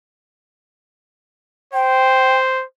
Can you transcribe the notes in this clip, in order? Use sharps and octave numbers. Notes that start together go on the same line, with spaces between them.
C5 G5